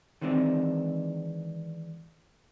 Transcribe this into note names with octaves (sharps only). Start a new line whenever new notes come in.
D#3 E3 G#3 C4 D4